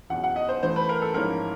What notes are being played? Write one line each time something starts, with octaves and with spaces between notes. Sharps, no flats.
E2 B2 F#3 F#5
F#5
D#5
C5
G2 E3 A3 C5
B4
A#4
A4
G#2 F3 A#3 C#4 E4 A#4